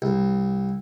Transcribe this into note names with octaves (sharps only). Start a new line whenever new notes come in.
C2